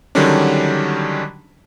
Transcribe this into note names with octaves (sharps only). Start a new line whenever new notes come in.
D3 D#3 F#3 G3 C#4 D4